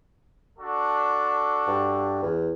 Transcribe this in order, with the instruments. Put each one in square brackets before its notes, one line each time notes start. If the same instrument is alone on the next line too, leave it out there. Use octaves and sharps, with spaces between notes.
[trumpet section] D4 F#4 A4
[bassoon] G2
E2